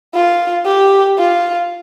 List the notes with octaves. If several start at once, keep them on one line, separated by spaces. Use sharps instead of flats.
F4
G4
F4